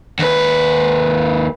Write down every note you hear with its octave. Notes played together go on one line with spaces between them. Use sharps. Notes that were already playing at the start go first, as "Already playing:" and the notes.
D#2 B4